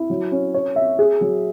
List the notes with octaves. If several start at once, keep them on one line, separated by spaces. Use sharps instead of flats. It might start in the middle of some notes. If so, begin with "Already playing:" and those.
Already playing: E4
F#3
C#4
C#5
E5
G#4
F#3